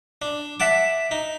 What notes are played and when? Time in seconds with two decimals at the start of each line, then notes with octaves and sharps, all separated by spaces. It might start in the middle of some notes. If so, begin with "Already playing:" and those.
0.22 D4
0.60 E5 F#5 A5 D6
1.11 D#4